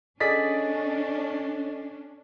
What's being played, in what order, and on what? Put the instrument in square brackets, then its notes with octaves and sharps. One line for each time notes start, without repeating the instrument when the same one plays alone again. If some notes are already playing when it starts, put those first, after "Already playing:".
[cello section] C#4 D4 [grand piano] G#4 D5 B6 [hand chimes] A4 D#5 A6